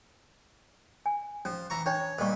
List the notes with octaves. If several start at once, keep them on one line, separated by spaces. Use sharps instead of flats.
G#5
F3 C#4
E3 A#5 C#6
D4 C5 C#5 G5
G2 A#2 C5 D#5 C#6